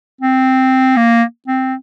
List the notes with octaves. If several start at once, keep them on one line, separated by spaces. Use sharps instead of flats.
C4
A#3
C4